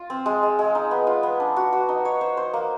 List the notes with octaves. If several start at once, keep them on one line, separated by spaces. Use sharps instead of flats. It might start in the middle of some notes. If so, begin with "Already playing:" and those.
Already playing: F4
C4
G#3
G#3
G#3
D#4
B3
F4
B3
D4
F#4
F#4
D#4
C#5
C5
C5
A#3